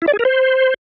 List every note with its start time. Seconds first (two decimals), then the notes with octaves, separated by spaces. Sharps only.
0.02 E4
0.08 D5
0.13 G#4
0.19 A#4
0.25 C5